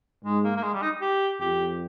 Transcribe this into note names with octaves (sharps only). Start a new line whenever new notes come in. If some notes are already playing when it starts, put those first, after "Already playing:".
G#2 G#3
A#3
A#3
G#3
G3
D#4
G4
F2 G4